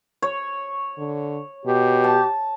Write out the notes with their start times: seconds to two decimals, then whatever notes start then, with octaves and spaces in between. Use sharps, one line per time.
0.22 C#5
0.98 D3
1.66 B2 G4
2.04 A5